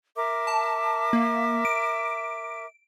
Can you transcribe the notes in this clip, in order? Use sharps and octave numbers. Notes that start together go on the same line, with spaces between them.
A#4 E5 D6
A5
A#3
D7